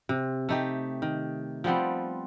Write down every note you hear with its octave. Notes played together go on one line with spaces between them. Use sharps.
C3
A3 D#4 G4
D#3
F3 G3 B3 C4